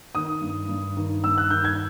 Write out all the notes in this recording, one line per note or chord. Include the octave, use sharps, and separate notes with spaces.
D#3 D#6
G2
G2
D#3
G2 E6
F#6
D#3 G6
G#6